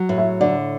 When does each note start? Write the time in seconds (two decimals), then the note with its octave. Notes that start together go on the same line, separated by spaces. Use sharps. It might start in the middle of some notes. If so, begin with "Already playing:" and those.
Already playing: F#3
0.09 A2
0.18 E5
0.41 D3 D5